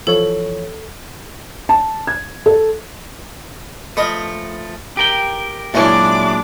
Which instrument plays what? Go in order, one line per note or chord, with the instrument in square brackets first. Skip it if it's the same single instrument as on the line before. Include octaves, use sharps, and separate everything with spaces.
[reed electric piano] E3 F3 C#5 [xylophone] A4
[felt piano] A5
G#6
A4
[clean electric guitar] F3 A3 [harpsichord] B4 D#5
[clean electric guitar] G4 A#4 G5
[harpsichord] F#2 C#4 E4 [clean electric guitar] A#2 G#3 [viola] D4 D6